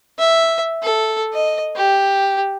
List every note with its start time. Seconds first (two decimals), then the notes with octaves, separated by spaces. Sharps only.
0.19 E5
0.82 A4
1.33 D#5
1.76 G4